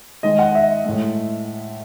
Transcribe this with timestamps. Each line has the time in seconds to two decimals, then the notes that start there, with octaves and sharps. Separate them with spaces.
0.23 D#3 G#3 D#5
0.39 F#5
0.55 E5
0.85 A2 G#3